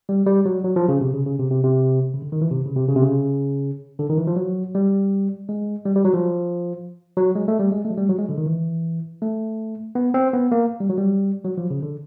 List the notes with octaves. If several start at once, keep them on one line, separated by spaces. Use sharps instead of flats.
G3
G3
F#3
F#3
F3
C#3
C3
C#3
C#3
C3
C3
C3
C#3
D3
D#3
E3
C3
C#3
C3
C#3
C3
C#3
D3
D#3
E3
F3
F#3
G3
G#3
G3
G3
F#3
F3
F#3
G#3
A3
G3
G#3
A3
F#3
G3
F#3
G#3
D3
D#3
E3
A3
B3
C4
B3
A#3
G3
F#3
G3
F#3
F3
C#3
D3